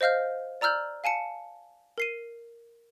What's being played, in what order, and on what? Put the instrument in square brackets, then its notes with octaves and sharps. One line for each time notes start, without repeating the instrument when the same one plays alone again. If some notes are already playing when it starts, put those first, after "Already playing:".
[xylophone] C5 D#5 F5 F6 G6
D5 A#5 E6 F6 G6 F#7
F5 G#5 A5 C#7
A#4 C7 D#7